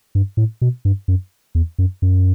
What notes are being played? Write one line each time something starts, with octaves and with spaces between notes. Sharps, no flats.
G2
A2
B2
G2
F#2
E2
F#2
F#2